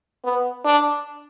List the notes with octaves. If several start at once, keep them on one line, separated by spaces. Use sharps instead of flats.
B3
D4